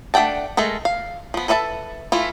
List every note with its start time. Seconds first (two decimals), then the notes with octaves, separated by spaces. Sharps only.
0.14 A3 D4 F#5 G5 A5
0.57 G#3 A3 A4 A#4
0.85 F5
1.34 F3 B3
1.48 A4 B4 E5 F5 A5
2.12 E3 A3 E4 F4